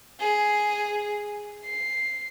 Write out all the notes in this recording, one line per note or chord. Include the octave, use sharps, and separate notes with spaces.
G#4
C7